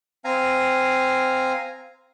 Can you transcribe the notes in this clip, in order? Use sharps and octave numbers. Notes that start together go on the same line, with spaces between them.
C4 F5 G#5 A#5